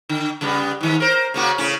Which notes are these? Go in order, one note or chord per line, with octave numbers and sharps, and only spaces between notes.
D3
C#3 G3 B3
G#2 D#3
A#4 C5
C#3 A#3 F#4
A2 C#3 C#4